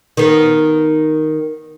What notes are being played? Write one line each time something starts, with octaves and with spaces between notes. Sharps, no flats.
D#3 B3